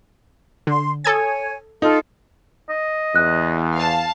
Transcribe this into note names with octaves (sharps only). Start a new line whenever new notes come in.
D3 C6
A4 C#5 G#5 D#6 G#6
D#4 F4 A4
D#5
E2 F#6
F5 A5